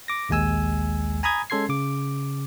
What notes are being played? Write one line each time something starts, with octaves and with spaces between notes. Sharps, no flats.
D6 A#6
A#1 D#2 G#3 G#5 E6
G#5 A#5 B5 D#6 G#6
G#3 C#4 A4 C6 G#6 C7
C#3 D6